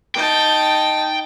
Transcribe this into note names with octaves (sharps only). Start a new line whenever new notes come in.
D#4 G5 A5